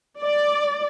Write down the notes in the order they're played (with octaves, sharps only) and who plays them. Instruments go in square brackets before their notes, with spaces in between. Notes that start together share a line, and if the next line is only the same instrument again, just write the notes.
[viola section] D5